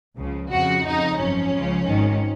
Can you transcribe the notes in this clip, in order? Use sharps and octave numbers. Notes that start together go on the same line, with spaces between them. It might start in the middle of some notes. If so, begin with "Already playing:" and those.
C#2 C#3 F3
F2 C#3 F3 F#4
F2 C#3 F3 D#4
G#1 F#2 F3 C#4
C#2 C#3 F3
G#1 G#2 D#3